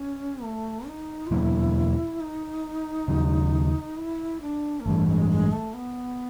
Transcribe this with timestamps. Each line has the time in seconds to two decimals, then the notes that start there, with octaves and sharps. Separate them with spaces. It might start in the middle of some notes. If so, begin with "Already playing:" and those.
Already playing: C#4
0.43 A3
0.87 D#4
1.27 F4
1.31 E2 B2 F#3 A#3 E4
2.21 D#4
3.08 D#2 C#3 F#3
3.97 E4
4.41 D4
4.80 A#3
4.86 A1 G2 E3 A3
5.08 G#3
5.30 G#3
5.52 A3
5.74 B3